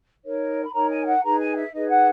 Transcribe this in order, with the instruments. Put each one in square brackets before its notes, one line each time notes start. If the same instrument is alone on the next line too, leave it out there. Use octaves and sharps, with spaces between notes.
[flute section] D#4 A#4 C#5
B5
D#4 A#4 C#5 A#5
G#5
F#5
D#4 G#4 B4 A#5
G#5
E5
D#4 G#4 B4 D#5
F#5